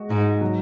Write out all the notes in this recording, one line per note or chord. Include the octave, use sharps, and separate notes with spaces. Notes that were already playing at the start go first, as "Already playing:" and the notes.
Already playing: G#3 F#4
G#2 D#4
F#3